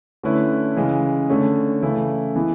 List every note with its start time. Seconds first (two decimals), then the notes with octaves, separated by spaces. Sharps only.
0.23 D3 A3 C#4 E4 B4
0.76 C#3 E3 G#3
1.30 D3 A3 C#4
1.83 C#3 E3 A3 E4
2.36 E3 G#3 B3 E4